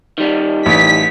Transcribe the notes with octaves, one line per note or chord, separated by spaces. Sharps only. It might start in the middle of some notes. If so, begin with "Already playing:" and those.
D#3 G3
A1 B6